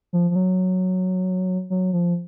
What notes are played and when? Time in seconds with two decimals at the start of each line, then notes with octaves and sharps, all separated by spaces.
0.13 F3
0.31 F3
0.36 F#3
1.70 F#3
1.93 F3